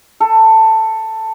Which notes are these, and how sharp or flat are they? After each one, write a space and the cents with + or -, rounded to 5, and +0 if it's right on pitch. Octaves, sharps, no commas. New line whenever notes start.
A4 +10